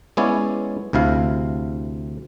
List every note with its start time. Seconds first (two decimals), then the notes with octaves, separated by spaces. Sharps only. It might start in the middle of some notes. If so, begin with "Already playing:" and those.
0.17 G#3 B3 C#4 E4 C#5 D5
0.93 D2 C3 E4 F5